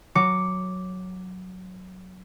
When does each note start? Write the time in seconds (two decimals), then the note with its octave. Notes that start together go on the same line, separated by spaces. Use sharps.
0.15 F#3 D6 C#7